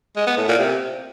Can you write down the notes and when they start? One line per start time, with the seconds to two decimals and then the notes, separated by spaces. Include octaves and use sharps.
0.16 G#3
0.27 B3
0.37 A2
0.48 A#2
0.59 C3